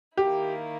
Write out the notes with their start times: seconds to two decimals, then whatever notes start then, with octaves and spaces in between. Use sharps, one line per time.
0.17 D#3 A#3 E4 G4